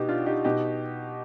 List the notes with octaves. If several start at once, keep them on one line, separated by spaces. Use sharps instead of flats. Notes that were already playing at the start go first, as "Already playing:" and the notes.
Already playing: B2 D#4 G4
D4 F4
D#4 G4
B2 D#4 G4